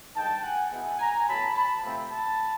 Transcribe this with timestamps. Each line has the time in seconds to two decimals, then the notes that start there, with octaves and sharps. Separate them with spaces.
0.15 G2 D#3 G#3 G5 A5
0.43 F#5 G#5
0.71 B2 G#3 B3 E4 F#5 G#5
0.99 G#5 A#5
1.28 A2 F#3 B3 A5 B5
1.56 A5 B5
1.83 C3 F3 A3 C4
2.12 A5 B5